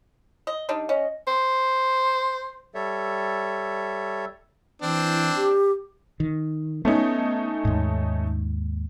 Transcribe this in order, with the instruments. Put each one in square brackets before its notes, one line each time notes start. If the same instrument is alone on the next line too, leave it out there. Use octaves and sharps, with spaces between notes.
[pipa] D#5
G3 D4 D#4
[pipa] C#4 [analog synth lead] D#5
[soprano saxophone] C5
[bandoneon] G3 A4 C#5 E5
[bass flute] E3 [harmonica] C4 D4
[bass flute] G4
[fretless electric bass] D#3
[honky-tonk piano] A3 C#4 D#4 [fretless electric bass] B3
[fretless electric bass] D#2 G#2